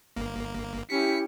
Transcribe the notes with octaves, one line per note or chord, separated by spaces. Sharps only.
G1 A#3
C#4 E4 G4 B6 C#7